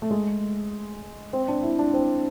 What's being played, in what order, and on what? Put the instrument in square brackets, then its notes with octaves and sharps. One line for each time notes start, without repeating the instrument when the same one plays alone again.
[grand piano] A3
G#3
C4
D4
E4
D4
C4